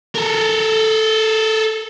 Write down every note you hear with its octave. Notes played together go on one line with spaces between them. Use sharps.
A4 A#4